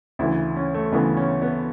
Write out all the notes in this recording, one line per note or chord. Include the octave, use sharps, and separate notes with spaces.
D2 C#3 E3 E4
C#4
A3
D2 C#3 E3 B3
C#4
B3